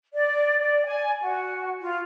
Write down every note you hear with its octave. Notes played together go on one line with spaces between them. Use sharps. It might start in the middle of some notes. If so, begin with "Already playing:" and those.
D5
D5
G#5
F#4
F4